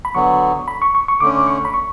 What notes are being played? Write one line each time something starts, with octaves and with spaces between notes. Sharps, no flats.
B5
D3 F#3 B3 C#6
B5
C#6
C#6
C#6
D3 A3 C#4 D6
C#6
B5
C#6